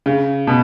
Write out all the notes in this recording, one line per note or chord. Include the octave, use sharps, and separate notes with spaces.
C#3
B2